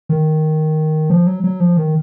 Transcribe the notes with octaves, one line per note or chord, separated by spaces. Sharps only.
D#3
F3
F#3
F#3
F3
D#3